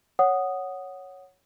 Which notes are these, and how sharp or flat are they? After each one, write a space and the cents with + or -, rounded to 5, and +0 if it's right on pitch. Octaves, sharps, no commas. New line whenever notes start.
C#5 +0 F#5 +0 D#6 -5